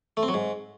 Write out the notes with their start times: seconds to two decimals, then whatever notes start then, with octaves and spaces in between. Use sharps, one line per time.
0.17 A3
0.23 C4
0.28 F#3
0.34 G#2